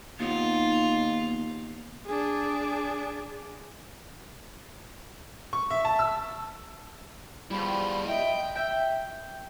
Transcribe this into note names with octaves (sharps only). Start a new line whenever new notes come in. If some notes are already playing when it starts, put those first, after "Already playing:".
D#2 B3 D#4 F4
D4 G#4
C#6
E5
A5
E6
F3 G3 E4 G#4 B5
D#5 E5 G5
E5 G5